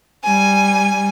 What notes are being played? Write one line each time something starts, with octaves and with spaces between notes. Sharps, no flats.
G3 G#5